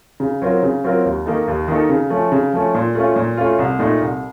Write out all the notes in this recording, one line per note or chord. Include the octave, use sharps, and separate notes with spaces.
C#3
F#3 C4 F4 A#4
C#3
F#3 C4 F4 A#4
D#2
D#3 A#3 D#4 A4
D#2
D#3 A#3 D#4 A4
C#3
F3 A3 C#4
C#3
F3 A3 C#4
A#2
A3 C#4 F4
A#2
A3 C#4 F4
C2
A#2 A3 D#4
C2